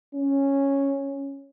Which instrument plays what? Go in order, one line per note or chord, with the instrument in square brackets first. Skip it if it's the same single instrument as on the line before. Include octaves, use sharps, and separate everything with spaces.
[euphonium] C#4